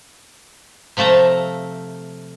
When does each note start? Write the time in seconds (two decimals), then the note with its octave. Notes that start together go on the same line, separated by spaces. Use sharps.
0.97 C3 F3 A3 A5 A#5